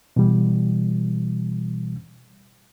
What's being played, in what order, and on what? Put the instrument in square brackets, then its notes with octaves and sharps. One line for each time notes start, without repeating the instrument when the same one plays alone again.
[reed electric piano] B2 E3 G3